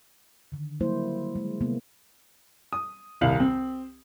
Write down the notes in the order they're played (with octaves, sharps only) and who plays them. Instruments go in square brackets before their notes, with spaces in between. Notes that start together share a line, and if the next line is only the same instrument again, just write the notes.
[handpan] D3 D#3
F#3 G3 A#3 E4 C5
G#3
C3 A#3 B3
[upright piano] D#6
D#1 C2 F5 F#7
C4